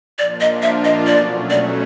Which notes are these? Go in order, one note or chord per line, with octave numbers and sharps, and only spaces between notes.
A#2 F3 A#3 D4 F4 D5
D#5
E5
D#5
B2 F#3 A3 C#4 D5
D5